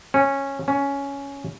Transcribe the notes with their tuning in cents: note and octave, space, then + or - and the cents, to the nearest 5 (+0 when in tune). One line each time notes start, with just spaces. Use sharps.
C#4 -10
C#4 +10